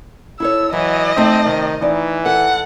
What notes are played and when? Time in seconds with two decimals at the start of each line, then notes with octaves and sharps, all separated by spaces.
0.40 E4 A4 C#5 E6
0.73 E3 F#3 D#5
1.17 A3 C4 D#4
1.46 C3 D#3
1.82 E3 D#4 D5
2.26 A4 F#5